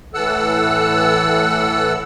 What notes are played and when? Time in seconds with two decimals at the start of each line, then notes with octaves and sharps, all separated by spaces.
0.14 A2 E3 A4 F#5 E6 F#6